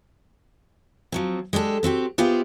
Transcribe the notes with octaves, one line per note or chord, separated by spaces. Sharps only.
F3 F#3 C4
G#3 D4 G4 A4
B3 C4 F#4 G4
B3 F4 G4 G#4 C5 E5